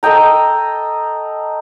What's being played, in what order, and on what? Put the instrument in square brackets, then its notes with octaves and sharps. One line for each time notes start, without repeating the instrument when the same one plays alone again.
[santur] A4 D#5 G5 A#5